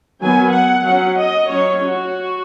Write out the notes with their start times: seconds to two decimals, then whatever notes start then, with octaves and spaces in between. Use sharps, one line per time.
0.20 D#3 F#3 B3 G#5
0.52 F#5
0.85 F#3 C#4 F#5
1.17 D#5
1.50 F#3 C#4 C#5
1.83 F#4